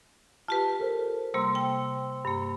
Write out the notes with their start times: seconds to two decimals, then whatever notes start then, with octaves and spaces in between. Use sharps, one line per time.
0.48 F4 G4 B4 A5
0.80 A4 A#4 C5
1.34 C3 G3 A#3 C5 C6 E6
1.55 G5
2.25 G2 A#3